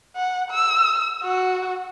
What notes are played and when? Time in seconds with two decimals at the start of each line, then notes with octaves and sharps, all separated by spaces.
0.16 F#5
0.51 E6
1.23 F#4